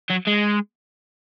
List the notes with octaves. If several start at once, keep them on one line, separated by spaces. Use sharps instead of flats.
F#3
G#3